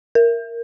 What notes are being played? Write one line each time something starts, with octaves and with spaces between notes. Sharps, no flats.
A#4